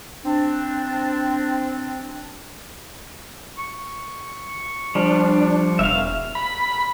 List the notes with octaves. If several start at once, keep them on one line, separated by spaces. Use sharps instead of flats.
C4 D4
C#6
F3 G3 D4
E1 E5 F5
B5